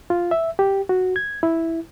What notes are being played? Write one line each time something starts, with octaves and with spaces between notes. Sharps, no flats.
F4
E5
G4
F#4
G#6
E4